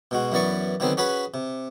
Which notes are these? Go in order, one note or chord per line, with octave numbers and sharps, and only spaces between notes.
B2 G#3 F#4
F#2 E3 B3 D5 C#6
D3 D#3 F#3 B3 C4
C#4 F#4 G#4 B4 B5
C3